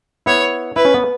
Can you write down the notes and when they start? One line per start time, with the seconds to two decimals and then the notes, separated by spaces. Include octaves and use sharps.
0.26 B3 E4 C#5
0.76 E4 B4
0.85 C#4
0.94 B3